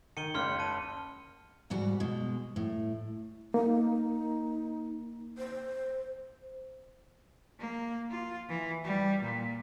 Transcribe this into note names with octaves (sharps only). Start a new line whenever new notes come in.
D#3 C#7 D#7 G7
F#1 C#2 C6 F6 C#7
A5 D#7
D2 G#2 G3 F#4
B2 G#3
A2
A#3 D#4
C5
A#3
F4
E3
G3
A#2